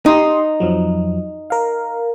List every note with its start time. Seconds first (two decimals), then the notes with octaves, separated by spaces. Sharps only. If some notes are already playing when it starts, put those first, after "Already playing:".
0.06 D#4 G4 C6 D#6
0.60 F2 F3 F#3
1.50 A#4 F5